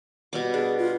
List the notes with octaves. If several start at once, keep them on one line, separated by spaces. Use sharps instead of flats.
B2 G3 D6
D4 G#4
F4